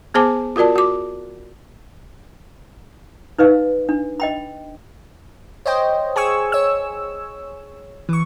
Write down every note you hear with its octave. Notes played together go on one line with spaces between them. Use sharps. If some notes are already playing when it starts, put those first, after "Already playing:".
B3 G#4 C5 G#5 A5 D6
F4 F#4 A#4 D5 A5
F#4 D6
D#4 B4 D#5 F5
D4
D#5 G5 B5
C5 C#5 D#5 G5
G#4 G#5 C#6 E6
C#5 E6
E3 C#6